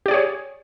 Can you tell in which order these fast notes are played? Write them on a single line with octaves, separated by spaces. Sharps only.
G4 D5 G#4 C#5